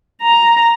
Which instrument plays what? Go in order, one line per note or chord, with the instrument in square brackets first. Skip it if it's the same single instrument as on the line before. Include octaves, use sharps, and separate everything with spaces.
[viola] A#5